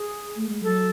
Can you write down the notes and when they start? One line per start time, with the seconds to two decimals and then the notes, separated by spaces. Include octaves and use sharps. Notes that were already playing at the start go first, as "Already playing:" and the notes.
Already playing: G#4
0.36 A3
0.49 G#3
0.63 F#3 A4